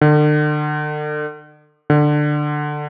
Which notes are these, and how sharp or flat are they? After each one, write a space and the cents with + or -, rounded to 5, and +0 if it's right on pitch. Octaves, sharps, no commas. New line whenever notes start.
D3 +35
D3 +15